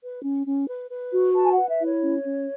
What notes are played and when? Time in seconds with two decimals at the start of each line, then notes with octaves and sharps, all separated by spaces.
0.03 B4
0.24 C#4
0.46 C#4
0.69 B4
0.91 B4
1.13 F#4
1.35 B4 A5
1.44 G#5
1.51 F#5
1.57 B4
1.69 E5
1.80 E4 C#5
2.02 C#4
2.24 C#4